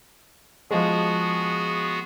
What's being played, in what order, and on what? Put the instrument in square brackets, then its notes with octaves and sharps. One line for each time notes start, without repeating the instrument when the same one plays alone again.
[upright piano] F3 G#3 [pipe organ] B3 F#4 G#4